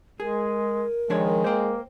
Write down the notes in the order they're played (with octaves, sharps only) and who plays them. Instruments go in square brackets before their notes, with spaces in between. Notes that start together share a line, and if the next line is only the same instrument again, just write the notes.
[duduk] G#3 [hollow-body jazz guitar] G#4 [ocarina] A#4
[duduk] D#3 [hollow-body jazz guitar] F3 D4 C#5 [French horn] G#3
[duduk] A#3 [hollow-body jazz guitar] C5 G5